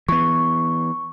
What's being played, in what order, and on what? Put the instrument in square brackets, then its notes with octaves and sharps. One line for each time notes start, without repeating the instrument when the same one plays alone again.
[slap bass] E3 B3 [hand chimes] C#6